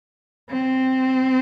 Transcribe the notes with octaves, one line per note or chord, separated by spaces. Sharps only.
C4